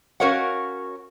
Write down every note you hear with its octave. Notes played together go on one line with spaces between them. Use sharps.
C#4 F#4 A#4 C#5 F5 F#5